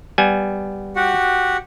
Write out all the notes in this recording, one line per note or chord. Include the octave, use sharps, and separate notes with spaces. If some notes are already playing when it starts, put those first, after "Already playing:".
G3 B3 G#5
F#4 G4 F#5